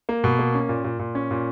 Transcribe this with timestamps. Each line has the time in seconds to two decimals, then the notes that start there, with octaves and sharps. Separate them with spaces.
0.09 A#3
0.24 B2
0.39 A#3
0.54 C#4
0.69 A#2
0.84 A#2
0.99 A#2
1.15 C#4
1.31 A#2